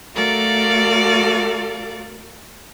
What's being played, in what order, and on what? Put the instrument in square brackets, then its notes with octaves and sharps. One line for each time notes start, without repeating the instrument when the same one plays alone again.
[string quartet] A3 F#4 A4 A#4 D5 F5